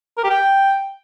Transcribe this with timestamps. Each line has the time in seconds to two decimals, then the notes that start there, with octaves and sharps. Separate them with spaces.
0.18 A#4
0.24 G4
0.30 G5